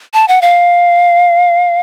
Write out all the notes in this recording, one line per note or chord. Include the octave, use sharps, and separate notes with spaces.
A5
F#5
F5